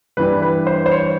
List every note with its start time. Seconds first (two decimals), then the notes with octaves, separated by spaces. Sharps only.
0.17 G2 E3 G3 B4
0.42 B4
0.67 C5
0.86 C5
0.91 C#5